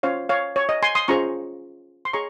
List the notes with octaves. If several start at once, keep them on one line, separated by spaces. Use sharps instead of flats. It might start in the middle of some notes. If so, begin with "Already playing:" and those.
C#4 F4 C5 C#5 F5
C#5 F5
C#5
D#5
G#5 C6
C6 D#6
C#4 F4 G#4 C5 A#5 C#6
C6
G#4 C#5 A#5 C#6